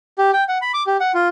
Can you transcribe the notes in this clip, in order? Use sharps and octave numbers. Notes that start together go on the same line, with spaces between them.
G4
G5
F#5
B5
D6
G4
F#5
F4